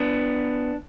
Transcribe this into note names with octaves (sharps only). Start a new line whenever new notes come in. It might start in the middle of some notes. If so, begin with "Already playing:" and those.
Already playing: B3 D4